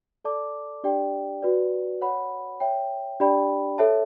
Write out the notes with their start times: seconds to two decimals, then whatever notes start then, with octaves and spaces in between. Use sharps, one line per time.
0.25 A4 D5 A5 D6
0.84 D4 G4 D5 G5
1.42 F#4 B4 D5
2.01 C#5 F#5 B5
2.60 C#5 E5 G5
3.20 D4 G4 D5 G5 B5
3.78 A4 C#5 E5 A5